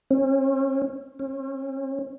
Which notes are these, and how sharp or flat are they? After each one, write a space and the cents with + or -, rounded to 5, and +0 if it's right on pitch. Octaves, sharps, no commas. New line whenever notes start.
C#4 -45
C#4 -45